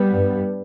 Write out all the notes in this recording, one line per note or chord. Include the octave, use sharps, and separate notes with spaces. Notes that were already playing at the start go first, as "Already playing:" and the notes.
Already playing: G3 B3
G2